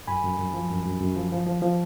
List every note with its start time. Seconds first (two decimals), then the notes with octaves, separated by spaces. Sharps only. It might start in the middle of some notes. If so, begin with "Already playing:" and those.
0.07 F#2 G#5 B5
0.24 F#2
0.39 F#2
0.54 F3
0.70 F#2
0.85 F#2
1.01 F#2
1.16 F3
1.32 F3
1.47 F3
1.62 F3